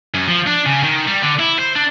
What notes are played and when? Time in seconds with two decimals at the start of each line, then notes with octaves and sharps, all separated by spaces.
0.14 F#2
0.28 F3
0.47 D4
0.66 C#3
0.83 D#3
1.07 G3
1.22 D3
1.39 E4
1.59 C5
1.75 D4